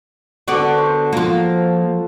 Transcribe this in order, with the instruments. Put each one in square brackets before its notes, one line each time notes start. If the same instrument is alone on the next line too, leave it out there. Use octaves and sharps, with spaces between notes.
[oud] D3 B3 D5 [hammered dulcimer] F#4 A4
[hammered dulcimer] C5
[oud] F3 A#3 [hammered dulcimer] F4